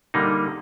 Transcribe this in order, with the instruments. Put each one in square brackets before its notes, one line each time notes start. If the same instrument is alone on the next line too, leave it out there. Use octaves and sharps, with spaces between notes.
[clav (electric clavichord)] D3 G3 A#3 D#4